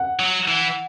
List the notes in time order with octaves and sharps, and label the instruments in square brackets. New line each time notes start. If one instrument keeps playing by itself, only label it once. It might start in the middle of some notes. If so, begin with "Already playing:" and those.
Already playing: [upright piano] F#5
[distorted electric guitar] F#3
E3